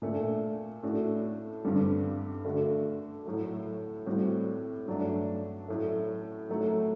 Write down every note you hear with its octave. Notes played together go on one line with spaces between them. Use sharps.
A#2 A3 D4
A2 A3 D4 F#4
G2 D3 G3 C4
D3 A3 D4 F#4
A2 F#3 A3
A2 G3 C4 F#4
G2 F#3 A3 D4
A2 F#3 A3
A2 F#3 A3 D#4 F#4